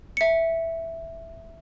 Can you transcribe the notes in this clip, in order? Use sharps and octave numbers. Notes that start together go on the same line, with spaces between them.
E5 C#7